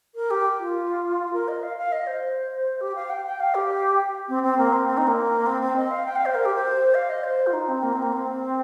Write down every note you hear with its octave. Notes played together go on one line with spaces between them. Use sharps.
A#4
G4
F4
A#4
D#5
F5
F5
D#5
C5
G4
F5
G5
G5
F5
G4
C4
C4
A#3
C4
C4
D#4
A#3
C4
C4
D#5
F5
G5
F5
C5
A#4
G4
C5
F5
D#5
C5
F4
D#4
C4
A#3
C4
A#3
C4